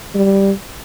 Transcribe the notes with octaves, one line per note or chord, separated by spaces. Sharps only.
G3